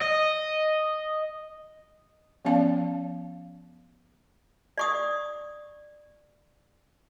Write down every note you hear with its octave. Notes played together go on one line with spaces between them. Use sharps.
D#5
F3 B3 C#4 D5 F5 A5
D5 C#6 D#6